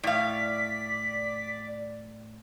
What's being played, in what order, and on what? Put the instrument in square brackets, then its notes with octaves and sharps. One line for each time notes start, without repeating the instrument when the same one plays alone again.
[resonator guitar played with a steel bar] A2 F5 [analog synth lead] D5 [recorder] B6